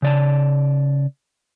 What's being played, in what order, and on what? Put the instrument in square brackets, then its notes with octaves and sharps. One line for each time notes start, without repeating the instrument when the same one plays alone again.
[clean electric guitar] C#3 D5 A5